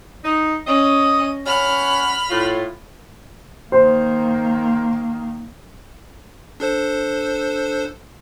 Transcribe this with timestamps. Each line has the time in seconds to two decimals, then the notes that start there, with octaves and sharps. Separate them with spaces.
0.23 D#4
0.67 C#4 D#5
1.46 C#4 F#5 B5 F6
2.30 A2 F4
3.72 D#3 A#3 C5
6.60 D4 A4 C5